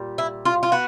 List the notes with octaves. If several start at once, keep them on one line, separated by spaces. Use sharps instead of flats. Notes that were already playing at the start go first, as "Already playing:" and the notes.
Already playing: A#2 G3
E4
F4
F4
B3 F#4